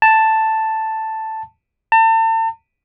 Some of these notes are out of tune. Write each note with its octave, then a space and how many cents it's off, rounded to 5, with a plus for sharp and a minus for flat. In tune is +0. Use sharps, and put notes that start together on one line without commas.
A5 +5
A5 +40